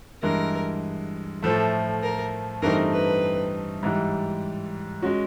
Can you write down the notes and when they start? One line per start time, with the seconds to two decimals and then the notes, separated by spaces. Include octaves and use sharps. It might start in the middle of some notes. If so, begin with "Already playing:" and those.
0.22 G2 E3 G#3 A#4
1.42 A2 F3 A3 A4
2.03 A#4
2.62 G2 E3 A3 C4 D#4 A#4
2.93 B4
3.83 G#2 E3 G3
5.03 G#3 C#4 F#4